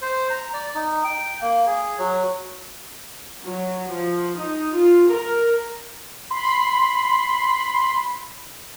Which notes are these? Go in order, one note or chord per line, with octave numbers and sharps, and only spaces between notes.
C5
A#5
D5
D#4
G5
A#3
G#4
F#3
F#3
F3
D#4
F4
A#4
B5 C6